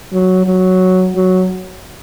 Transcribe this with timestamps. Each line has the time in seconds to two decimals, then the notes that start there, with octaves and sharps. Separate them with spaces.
0.13 F#3
0.46 F#3
1.16 F#3